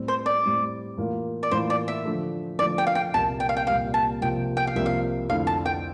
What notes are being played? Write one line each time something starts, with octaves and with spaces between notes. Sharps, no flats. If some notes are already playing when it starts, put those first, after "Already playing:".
Already playing: A2 G3 C4
C5
D5
A2 G3 C4
A2 E3 A#3 F4
D5
A2 E3 A#3 F4 C5
D5
E5
D3 F3 A3
D3 F3 A3 D5
G5
F5
G5
C2 A#2 G3 A#3 A5
G5
F5
G5
C2 A#2 G3 A#3 F5
A5
C2 C3 F3 A#3 F4 G5
G5
F5
C2 C3 F3 A#3 F4 E5
F5
F2 D3 A3 E4 F5
A5
G5